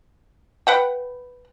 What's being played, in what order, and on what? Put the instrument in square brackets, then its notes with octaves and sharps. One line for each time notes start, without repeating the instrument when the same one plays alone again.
[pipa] B4 F#5 G5